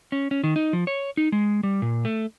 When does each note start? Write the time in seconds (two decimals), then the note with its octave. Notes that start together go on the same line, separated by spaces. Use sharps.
0.12 C#4
0.31 C#4
0.44 D#3
0.56 D#4
0.73 F3
0.87 C#5
1.17 D#4
1.32 G#3
1.63 G3
1.82 A#2
2.05 A3